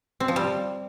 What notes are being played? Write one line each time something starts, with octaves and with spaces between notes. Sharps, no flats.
C4
F3
G3